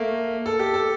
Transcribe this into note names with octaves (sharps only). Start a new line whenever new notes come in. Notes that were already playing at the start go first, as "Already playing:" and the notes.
Already playing: A3 A#3
A4
G4
A4